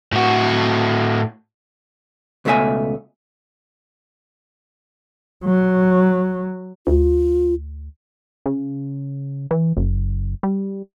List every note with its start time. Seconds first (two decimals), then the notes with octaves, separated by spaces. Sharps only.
0.13 A2 F#4
2.45 C#2 B2 A3 D4 E5 G#5
5.44 F#3
6.87 D2 F4
8.46 C#3
9.51 E3
9.77 F#1
10.43 G3